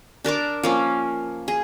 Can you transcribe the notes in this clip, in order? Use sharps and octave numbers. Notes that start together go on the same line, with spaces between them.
D4 A#4 A5 D6
F3 A#3 C#4
G#4